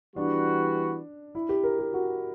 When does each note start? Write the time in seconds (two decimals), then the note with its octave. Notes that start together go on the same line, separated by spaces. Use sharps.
0.16 E3 G3 B3 D4 F#4
1.35 E4
1.49 G4
1.63 A#4
1.79 G4
1.93 F#4